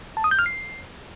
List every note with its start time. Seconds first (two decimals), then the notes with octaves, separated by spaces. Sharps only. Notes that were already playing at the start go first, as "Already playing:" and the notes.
0.17 A5
0.24 D#6
0.31 G6
0.39 F6
0.46 C7